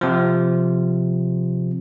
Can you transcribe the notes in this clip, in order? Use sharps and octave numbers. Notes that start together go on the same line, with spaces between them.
C3 F3